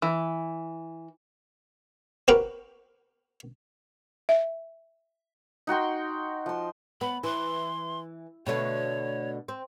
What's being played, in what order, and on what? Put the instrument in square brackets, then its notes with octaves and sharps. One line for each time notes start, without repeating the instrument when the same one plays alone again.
[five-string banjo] E3
[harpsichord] C4 F#4 G4 A#4 B4
[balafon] E5
[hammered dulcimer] D#4 F#4 G5 C6
F3 C6
[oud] B3 [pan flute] B5
[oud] E3 [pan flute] C6
[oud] B2 D3 A3 [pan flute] C#5
[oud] C4